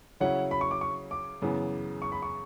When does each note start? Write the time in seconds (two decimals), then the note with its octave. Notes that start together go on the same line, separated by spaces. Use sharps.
0.20 C#3 F#3 C#4 E4 F#5
0.51 B5
0.61 C#6
0.71 D6
0.81 C#6
1.11 D6
1.42 F#2 C#3 E3 B3
2.02 C#6
2.12 B5
2.22 C#6